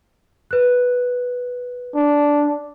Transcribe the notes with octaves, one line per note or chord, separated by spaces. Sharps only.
B4 F#6
D4